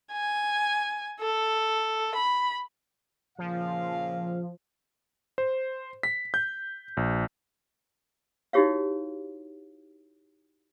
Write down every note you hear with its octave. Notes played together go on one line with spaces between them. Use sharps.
G#5
A4
B5
A#2 C#3 F3 F5
C5
B6
G6
A#1
D#4 E4 F#4 G4 C#5 F5